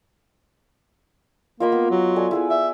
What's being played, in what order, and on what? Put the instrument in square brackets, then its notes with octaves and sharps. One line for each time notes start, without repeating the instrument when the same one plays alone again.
[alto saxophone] A#3 [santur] F4 D#5 B5
[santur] B3
[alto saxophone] F#3
[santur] A4 D5 G#5
E4 G#4 B4
[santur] D5 [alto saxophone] E5